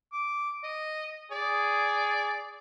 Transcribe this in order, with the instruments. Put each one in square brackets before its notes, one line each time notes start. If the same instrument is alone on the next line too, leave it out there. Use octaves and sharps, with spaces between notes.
[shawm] D6
D#5
[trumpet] G#4 [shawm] D5